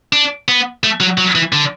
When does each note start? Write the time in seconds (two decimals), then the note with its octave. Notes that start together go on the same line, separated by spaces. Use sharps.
0.13 D4
0.49 B3
0.84 A3
1.00 F#3
1.18 F#3
1.35 E3
1.53 D3